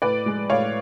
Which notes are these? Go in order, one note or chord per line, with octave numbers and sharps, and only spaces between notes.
A2 B4 D5
G#3
A2 C#5 F5